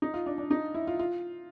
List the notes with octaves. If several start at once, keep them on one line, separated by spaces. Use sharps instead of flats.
D#4
F4
D4
D4
D#4
E4
F4
F4